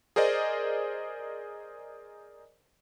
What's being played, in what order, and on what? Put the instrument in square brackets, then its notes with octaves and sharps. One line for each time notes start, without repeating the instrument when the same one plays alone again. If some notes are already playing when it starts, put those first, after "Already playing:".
[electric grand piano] G#4 A#4 C5 D5 D#5